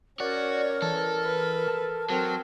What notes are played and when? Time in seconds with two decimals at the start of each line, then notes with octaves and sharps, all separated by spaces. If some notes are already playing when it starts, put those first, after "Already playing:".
0.20 C#4 F#4 A#4 C#5 D5
0.82 E3 A4
1.24 B4
1.68 A5
2.10 F#3 C4 A#4